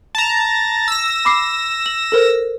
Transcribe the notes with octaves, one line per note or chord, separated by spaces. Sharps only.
A5 A#5
E6 A#6
B5 D6 C7
F#7
A4 A#4 C5